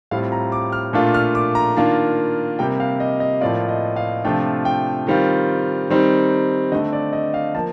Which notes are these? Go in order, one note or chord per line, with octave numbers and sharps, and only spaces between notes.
A2 G3 C4 F4 F5
A#5
D6
F6
A#2 A3 D4 F4
F6
D6
A#5
D#3 A#3 D4 F4 A5
C3 G3 A#3 G5
F5
D#5
D#5
A2 F3 A#3 F4 D5
D#5
F5
C3 F3 A3 D4 F4 G5
G5
D#3 G3 C4 F4
D#3 G3 C4 D#4
D3 A3 C4 D#5
D5
D#5
F5
F3 A#3 A5